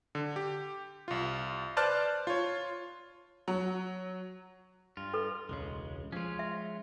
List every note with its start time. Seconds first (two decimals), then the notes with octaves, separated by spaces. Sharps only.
0.15 D3
0.36 G4
1.08 C2 F4
1.77 B4 C5 D5 A5 F6 F#6
2.27 F4 C#5
3.48 F#3
4.97 G2 F4
5.14 A4 B4
5.49 E1 C#2 C#3 G#3
6.12 F3 G#3 C#4 F4
6.39 E5